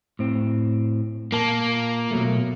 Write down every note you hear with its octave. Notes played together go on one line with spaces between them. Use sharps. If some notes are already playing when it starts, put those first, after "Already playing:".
A2 C4
A#2 A#3 A5
B2 F#3 A3